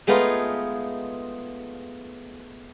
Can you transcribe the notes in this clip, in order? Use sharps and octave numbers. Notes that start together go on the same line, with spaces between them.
G#3 A3 B3 D#4 F4 G#4